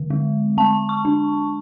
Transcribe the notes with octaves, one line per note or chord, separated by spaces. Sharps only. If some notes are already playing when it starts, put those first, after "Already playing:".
Already playing: D3 G#3
G#3
G#3 A5
C#6
D4